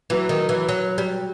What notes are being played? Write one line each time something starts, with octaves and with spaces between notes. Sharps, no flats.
E3 F#3
D#3
E3
F#3
G3